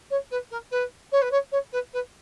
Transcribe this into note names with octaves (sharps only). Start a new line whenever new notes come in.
C#5
B4
A#4
B4
C#5
B4
C#5
C#5
B4
B4